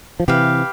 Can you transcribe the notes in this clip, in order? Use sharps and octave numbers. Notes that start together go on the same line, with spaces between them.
F3
C3 E3 G4 B4 F5